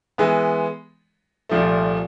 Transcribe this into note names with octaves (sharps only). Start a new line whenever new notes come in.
E3 G#3 B3
C2 A#2 F3 A3